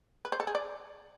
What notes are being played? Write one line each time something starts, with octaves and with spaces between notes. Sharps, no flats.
B4
C5
A4
G#4
D5